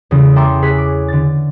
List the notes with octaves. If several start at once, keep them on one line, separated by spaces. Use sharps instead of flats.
E2 C#3 G#3
A4 E5 G5 A#5 C6 D6
G#4 C#5 F#6 B6
D6
D3 A6